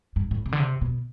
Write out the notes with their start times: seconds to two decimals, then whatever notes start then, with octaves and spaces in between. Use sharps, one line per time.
0.16 G2
0.31 A2
0.46 C3
0.52 D3
0.60 C3
0.81 B2